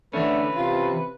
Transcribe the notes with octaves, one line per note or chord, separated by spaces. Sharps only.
D3 E3 A3 C#4 B4
C3 F4